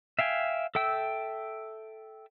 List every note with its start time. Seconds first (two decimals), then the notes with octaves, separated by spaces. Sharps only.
0.19 E5 F5 G5 G#5
0.75 A4 E5 G5 E6